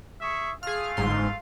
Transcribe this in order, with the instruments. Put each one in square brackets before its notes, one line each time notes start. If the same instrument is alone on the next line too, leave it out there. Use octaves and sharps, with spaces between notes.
[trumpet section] G#4 E5 C#6
[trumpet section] A3 F4 F5 [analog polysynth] G#4 F6
[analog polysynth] G1 G#2 C6